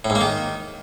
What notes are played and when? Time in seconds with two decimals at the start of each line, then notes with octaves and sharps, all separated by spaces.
0.05 A2
0.10 G#2
0.15 A#3
0.21 D#3